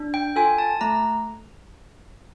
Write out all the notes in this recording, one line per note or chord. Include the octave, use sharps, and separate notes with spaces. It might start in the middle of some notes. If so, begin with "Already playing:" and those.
Already playing: D4
G5
F4 A4 G#5
A5
A3 A#5